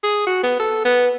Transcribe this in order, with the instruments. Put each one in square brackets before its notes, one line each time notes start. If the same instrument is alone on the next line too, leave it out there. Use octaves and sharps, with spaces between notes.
[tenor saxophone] G#4
F#4
B3
A4
B3